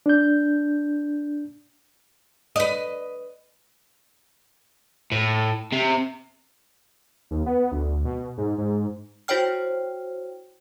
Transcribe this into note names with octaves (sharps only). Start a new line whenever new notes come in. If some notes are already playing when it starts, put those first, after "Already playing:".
D4 G6
B4 D#5
A2
C3
D#2
B3
D2
B2
G#2
G#2
E4 F#4 C5 C#5 G5 F6